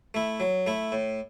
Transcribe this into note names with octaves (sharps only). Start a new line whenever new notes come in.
A3 E4
F#3
A3 E4
A2